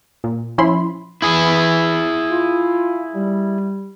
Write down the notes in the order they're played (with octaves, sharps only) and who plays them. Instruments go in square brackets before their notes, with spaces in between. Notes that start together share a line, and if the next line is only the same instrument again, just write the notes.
[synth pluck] A#2
F3 C#4 E4 B5 C6
[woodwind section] E3 [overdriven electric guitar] E4 G#4
[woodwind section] F4
G3